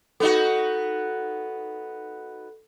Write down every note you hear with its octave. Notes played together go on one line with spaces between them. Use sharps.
B3 D#4 F#4 A4